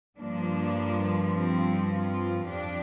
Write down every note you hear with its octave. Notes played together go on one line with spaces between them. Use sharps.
G2 F3 A#3 D4
C4
C4 F4
F2 F3 D4 G4